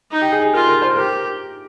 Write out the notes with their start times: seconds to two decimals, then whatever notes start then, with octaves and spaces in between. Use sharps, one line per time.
0.12 D#4
0.21 G4
0.32 G#4
0.43 G#4
0.53 F4 A#4
0.68 A#4
0.82 C5
0.96 G4 A#4